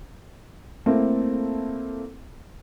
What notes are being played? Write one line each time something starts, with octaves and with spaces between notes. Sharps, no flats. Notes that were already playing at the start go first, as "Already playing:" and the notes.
A3 A#3 C4 E4